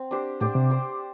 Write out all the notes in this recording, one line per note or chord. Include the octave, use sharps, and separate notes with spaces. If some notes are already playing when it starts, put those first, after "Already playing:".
Already playing: C4
D4 G4 C5
A2 D4 G4 C5
C3
D4 G4 C5